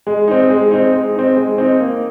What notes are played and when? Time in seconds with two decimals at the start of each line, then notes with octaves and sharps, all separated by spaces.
0.07 G#3
0.28 C4 D#4
0.50 G#3
0.71 C4 D#4
0.93 G#3
1.15 C4 D#4
1.37 G#3
1.58 C4 D#4
1.80 A#3